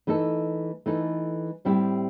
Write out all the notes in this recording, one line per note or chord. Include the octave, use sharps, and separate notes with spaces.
E3 A3 D#4 A4
E3 A3 D#4 A4
A2 G3 C4 E4 G4